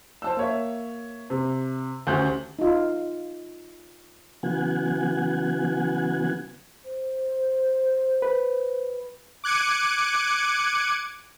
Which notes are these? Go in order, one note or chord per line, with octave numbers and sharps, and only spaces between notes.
C5 A5 E6
A#3 C#5 E5
C3
D2 C#4 G4 C5 G6
D#4 F4
C#3 E3 F#3 B3 F#5 G#5
C5
B4
D6 F#6 G#6 C#7 D#7